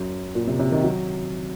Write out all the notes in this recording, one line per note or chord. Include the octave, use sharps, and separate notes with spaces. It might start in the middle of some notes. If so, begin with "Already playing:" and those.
Already playing: F#2
A#2
C3
C3
D#3
F#3